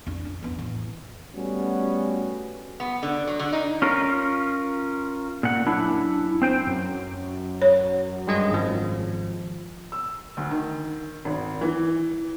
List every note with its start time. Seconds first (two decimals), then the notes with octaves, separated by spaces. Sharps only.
0.07 F2 D4
0.25 C#4
0.43 E2 B3
0.59 A1
1.34 G3 A3 B3 C#4 F#4
2.80 B3
3.03 D3
3.27 F#3
3.39 D3
3.53 D#4
3.82 C#4 F4 A#4
5.43 A#2 F#5
5.66 F#2 D4 E4
6.42 C4 C5 G5
6.67 F#2
7.62 C#5
8.27 G2 G#3 D#5
8.50 G#1 F3
9.92 E6
10.37 D2
10.51 D#3
11.25 G#1
11.61 E3